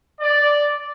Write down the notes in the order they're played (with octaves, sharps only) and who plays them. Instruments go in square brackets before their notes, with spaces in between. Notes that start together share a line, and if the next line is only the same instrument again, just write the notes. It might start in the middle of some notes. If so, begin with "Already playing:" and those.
[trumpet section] D5